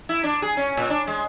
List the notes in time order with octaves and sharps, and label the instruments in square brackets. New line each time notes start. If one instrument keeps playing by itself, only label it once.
[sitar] E4
D4
G#4
C#4
A#2
D4
G#3